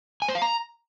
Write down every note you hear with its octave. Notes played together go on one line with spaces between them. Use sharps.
G#5
C5
F5
A#5